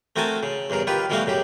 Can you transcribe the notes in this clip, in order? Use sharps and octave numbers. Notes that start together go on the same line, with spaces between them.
A3 C4 F#4 A#4 G#5 A5
C#3
E2 G2 C#3 A#4
D#3 F4 G4 B4
B2 E3 G3 A3 F#4 F5
F#2 C#3 G4